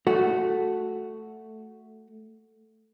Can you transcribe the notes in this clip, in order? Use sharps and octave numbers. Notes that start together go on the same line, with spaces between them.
A3 F#4